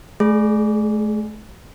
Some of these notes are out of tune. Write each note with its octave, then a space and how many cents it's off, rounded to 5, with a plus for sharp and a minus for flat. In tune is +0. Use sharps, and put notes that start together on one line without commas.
A3 -40 G#4 +10